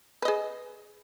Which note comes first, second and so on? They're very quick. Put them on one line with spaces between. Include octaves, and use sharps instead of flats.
B4 D#5 G#4